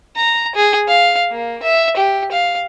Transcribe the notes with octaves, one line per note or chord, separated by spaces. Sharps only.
A#5
G#4
F5
A#3
E5
G4
F5